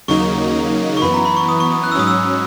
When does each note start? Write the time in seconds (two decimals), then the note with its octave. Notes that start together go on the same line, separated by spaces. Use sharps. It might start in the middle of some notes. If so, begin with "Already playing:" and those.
0.08 D#2 C#3 F#3 A#3 D#4 C#6
0.97 C#6
1.02 F#2 E3 B3 B5
1.14 A#5
1.25 B5
1.37 C#6
1.49 D#6
1.60 C#6
1.72 D#6
1.84 F#6
1.92 E6
1.95 G#2 F#3 C#4 D#6
2.08 E6